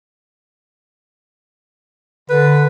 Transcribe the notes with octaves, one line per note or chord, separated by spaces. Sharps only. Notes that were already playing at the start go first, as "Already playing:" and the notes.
D3 B4